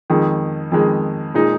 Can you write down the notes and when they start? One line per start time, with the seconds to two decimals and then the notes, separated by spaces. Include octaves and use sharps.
0.10 F2 D#3 G#3
0.72 F2 D#3 G#3
1.34 A#2 G#3 D#4